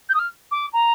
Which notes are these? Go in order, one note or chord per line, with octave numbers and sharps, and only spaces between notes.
G6
D#6
F6
D6
A#5